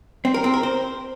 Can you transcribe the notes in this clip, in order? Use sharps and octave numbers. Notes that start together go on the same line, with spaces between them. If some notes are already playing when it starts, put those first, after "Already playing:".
C4
A#4
C4
A#4
C5